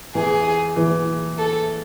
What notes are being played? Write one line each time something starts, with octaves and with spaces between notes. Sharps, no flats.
E2 E3 G#4
E2 E3
A4